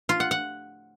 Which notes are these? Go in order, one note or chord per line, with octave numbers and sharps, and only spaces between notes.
F4
F#5
F#5